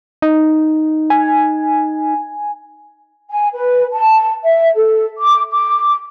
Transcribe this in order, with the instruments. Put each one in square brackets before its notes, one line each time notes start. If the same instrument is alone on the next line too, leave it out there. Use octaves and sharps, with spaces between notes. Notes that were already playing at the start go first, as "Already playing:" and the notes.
[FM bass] D#4
[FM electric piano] G#5
[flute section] G#5
B4
A5
E5
A4
D6
D6